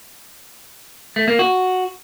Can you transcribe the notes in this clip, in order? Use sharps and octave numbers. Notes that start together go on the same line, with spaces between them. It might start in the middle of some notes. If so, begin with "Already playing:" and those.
A3
A#3
F#4